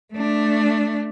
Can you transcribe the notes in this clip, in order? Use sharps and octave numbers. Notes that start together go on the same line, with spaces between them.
A3 D4